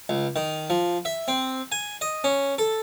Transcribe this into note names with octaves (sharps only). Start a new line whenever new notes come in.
C#2
D#3
F3
E5
C4
G#5
D#5
C#4
A4